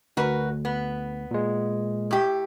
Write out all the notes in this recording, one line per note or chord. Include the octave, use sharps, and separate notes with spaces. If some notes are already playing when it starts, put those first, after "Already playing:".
D2 F#4 A#4 B4
B3
A#2 G#3
A2 G4